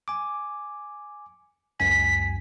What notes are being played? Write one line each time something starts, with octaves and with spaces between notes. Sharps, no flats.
G#5 D6
C#2 F#2 G#5 B6